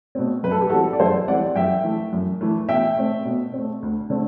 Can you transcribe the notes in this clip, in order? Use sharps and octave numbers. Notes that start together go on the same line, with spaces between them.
B2 A3 C4
F#2 B4
A4
G4
E3 G3 C4 F#4 A4
D5
F#2 A4 C5
E3 G3 C4 D5 F#5
F#2 E5 G5
E3 A3
F#2
E3 A3
B2 E5 G5
A3 C4
B2
A3 C4
D2
D3 A3 C4